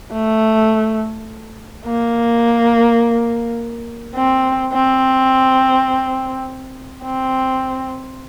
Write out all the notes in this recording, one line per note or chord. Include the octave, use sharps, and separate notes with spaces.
A3
A#3
C4
C4
C4